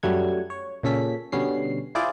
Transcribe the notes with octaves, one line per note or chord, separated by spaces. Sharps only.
F#2 F#3 G3 A3 F#5 G#6
C#5
A#2 C#3 C#4 A4 B6
B2 D3 G3 B3 C#4 C7
E4 F4 G#4 C5 D5